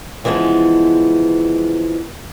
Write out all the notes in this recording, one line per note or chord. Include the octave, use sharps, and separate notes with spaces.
C#3 E3 F3 G#3 B3